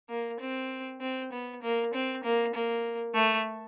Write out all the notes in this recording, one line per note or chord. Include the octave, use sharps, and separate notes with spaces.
A#3
C4
C4
B3
A#3
C4
A#3
A#3
A3